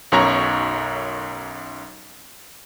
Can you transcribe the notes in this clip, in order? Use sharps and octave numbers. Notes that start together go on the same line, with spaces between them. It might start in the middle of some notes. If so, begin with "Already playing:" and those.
B1 F#2 C#5 A#5 C#6